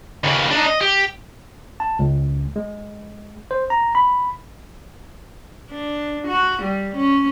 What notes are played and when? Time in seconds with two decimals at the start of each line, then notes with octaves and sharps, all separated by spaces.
0.24 D#2 C#3
0.51 D4 D#4
0.67 D#5
0.81 G4
1.80 A5
1.99 C#2
2.56 G#3
3.51 C5
3.70 A#5
3.95 B5
5.71 D4
6.28 F#4
6.63 G3
6.96 C#4